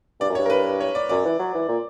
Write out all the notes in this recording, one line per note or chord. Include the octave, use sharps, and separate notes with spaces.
G2 D5
F#2
C#5
G2
A#4
B4
C#5
D5
F#2 D5
E3
F#3
E3
A#2